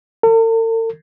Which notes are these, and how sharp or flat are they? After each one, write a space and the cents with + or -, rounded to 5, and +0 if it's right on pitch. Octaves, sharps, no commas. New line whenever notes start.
A4 +45